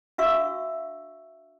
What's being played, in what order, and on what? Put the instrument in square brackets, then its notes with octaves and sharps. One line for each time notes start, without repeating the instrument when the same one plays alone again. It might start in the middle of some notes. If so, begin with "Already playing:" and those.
[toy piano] D4 F#4 E5 F5 C#6 E6